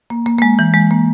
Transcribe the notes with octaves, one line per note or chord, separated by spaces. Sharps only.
A#3
A#3
A#3
G#3
E3
G#3
A#3